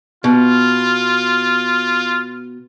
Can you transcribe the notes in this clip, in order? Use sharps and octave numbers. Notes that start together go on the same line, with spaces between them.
B2 F4